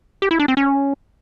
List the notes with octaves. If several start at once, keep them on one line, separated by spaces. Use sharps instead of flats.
G4
E4
D4
C4
C#4